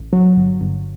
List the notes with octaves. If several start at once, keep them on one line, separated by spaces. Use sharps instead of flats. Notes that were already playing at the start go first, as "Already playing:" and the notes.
Already playing: A1
F#3
G1
G1